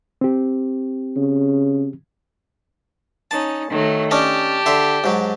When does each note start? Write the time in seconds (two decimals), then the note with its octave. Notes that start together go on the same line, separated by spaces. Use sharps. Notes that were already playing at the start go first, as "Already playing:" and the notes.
0.21 C4 G4
1.16 C#3
3.31 C#4 D#4 A5
3.69 D#3 F#3 A3
4.11 C#4 D4 G4 D#5 A5
4.66 D3 E5 C6
5.04 G#2 F#3